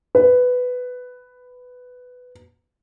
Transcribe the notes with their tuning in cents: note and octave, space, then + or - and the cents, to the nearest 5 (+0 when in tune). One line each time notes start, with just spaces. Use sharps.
B4 +10